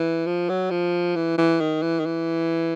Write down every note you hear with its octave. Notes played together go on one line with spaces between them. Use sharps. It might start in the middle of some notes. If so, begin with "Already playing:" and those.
Already playing: E3
F3
F#3
F3
E3
E3
D#3
E3
D#3
E3